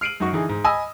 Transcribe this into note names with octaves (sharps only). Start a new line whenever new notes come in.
F6 C7 D7 D#7 F#7
F#2 D#4 F#4 C#6
D3 E3 D#4 G#4
G#2
D#5 G#5 B5 D#6 E6